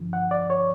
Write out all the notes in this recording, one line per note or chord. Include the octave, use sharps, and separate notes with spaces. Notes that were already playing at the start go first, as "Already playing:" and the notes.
Already playing: G2 D3 F3
F#5
D5
C#5